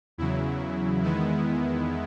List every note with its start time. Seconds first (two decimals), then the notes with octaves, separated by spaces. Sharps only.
0.18 E2 C#3 F#3 E4
1.02 E2 D#3 G#3 B3 E4